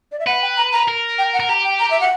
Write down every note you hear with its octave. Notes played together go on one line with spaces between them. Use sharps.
D5
E5
B4 F#5
G5
A#5
A#5
A#4
G5
F#5
A#4
G4 A#5
G5
A#5
E5
F#5